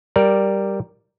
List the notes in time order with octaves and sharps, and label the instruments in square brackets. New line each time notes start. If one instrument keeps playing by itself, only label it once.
[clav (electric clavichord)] G3 A#4 D5